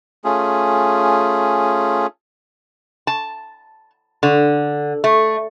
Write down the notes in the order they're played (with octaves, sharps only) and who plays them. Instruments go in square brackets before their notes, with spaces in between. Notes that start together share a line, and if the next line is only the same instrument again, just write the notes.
[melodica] A3 C#4 F4 G#4
[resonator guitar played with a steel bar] A5
D3
A3